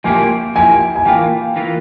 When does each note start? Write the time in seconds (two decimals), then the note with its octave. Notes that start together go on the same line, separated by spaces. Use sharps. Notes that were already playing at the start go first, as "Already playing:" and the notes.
0.04 F3 A#3 E4 G4 G#5
0.55 F3 A#3 E4 G4 G#5
0.95 G#5
1.05 E3 A#3 F4 G5
1.56 E3 A#3 F4